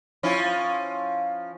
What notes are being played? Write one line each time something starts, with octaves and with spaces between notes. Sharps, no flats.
F3 C#4 E4